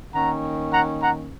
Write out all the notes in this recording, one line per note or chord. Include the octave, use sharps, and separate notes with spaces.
D#3 A#3 C#4 F#5 A#5
F#5 A#5
F#5 A#5